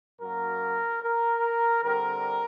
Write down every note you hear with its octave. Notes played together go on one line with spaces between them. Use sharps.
F#2 F#3 A#3 A#4
A#4
D3 G3 C4 A#4